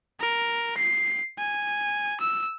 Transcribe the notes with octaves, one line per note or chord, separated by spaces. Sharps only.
A#4
C7
G#5
E6